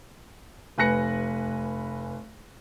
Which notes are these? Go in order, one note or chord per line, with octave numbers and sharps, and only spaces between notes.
F1 B4 G#5 F#6 A#6 C#7